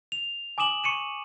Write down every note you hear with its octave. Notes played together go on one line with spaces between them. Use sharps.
F7
G#5 D6 D#6 E7 F#7
C#6 C#7 D#7 E7